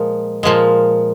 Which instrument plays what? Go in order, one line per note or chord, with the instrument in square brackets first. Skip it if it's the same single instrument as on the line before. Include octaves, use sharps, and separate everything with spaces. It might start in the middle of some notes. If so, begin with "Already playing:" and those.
Already playing: [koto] A#2 F3 G#3
A#2 F3 G#3